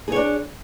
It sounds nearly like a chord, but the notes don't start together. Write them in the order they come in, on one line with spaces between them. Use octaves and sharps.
G#4 C#5 D4